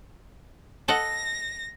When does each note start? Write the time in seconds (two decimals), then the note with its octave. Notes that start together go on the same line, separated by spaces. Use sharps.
0.88 A4 D#5 F#5 A#6